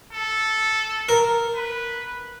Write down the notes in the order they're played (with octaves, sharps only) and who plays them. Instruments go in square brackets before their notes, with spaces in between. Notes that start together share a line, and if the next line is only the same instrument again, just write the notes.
[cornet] A4
[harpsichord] A#4
[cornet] B4